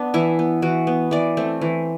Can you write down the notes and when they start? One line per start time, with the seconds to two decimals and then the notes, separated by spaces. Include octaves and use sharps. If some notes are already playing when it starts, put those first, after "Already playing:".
Already playing: B3 D4
0.14 E3 E4
0.39 B3
0.62 E3 F#4
0.87 B3
1.11 E3 D5
1.37 A3 C4
1.61 E3